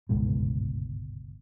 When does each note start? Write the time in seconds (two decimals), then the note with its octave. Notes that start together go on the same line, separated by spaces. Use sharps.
0.09 G1 C#2 G#2 B2